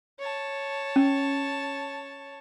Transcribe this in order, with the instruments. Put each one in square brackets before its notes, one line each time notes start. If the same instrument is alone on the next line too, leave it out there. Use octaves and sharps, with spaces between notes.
[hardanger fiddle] C#5 A5
[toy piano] C#4